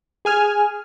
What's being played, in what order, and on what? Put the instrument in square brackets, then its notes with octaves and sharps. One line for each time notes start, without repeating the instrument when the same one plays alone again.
[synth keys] G#4 G#5 F6